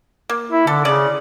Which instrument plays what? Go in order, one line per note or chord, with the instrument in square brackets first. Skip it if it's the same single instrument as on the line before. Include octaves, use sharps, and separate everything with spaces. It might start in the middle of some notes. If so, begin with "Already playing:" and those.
[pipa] A#3
[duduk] E4
[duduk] D3 [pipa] A4
[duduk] C#3 [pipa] C#4 D5